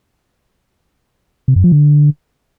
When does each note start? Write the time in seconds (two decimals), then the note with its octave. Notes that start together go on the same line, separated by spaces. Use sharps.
1.48 C3
1.56 F#2
1.64 F3
1.72 D3